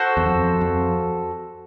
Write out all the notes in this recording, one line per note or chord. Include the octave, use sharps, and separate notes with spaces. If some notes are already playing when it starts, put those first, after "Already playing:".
Already playing: F#4 A4 C5
E2
F2
F2